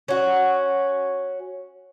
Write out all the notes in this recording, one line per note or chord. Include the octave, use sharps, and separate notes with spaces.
C#4 F#4